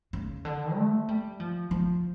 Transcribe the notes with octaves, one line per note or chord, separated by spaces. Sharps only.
C#3
D3
A3
G3
F3
F3